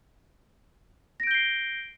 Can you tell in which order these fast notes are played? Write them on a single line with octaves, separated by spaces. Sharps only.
A#6 D7 G6 G7 C7